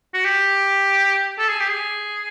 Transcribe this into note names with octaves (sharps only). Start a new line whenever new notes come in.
F#4
G4
A4
G#4
G4
G#4